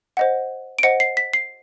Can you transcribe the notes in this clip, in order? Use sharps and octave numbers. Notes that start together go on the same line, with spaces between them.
C5 D#5 F#5
D7
C5 D#5 F#5 C#7
C7
B6
C7